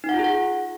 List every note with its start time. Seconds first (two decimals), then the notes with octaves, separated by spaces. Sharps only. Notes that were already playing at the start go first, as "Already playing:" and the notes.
0.04 D#4
0.09 F#5
0.14 F4
0.19 G#4
0.24 F#5